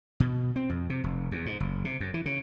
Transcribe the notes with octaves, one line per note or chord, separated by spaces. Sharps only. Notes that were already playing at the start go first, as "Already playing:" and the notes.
B2
C4
F2
C3
F1
E2
G#2
F#1
C3
F#2
E3
C#3